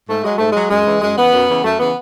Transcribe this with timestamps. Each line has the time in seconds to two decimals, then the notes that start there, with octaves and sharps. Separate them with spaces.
0.08 G#2 A3
0.24 F#3 G#3
0.38 G#2 A3
0.52 F#3 G#3
0.71 F#2 G#3
0.86 C#3 E3
1.02 F#2 G#3
1.17 C#3 E3 B3
1.33 F#2
1.49 C#3 E3
1.63 F#2 A3
1.79 C#3 E3 B3